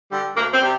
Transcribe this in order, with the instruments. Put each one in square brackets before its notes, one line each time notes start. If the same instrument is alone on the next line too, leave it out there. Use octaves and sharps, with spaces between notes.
[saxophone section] D3 G3
D2 A#3
C4
C3 G3